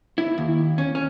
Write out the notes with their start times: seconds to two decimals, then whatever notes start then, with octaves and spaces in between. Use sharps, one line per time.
0.18 E4
0.38 D#2
0.78 C#4
0.95 C#4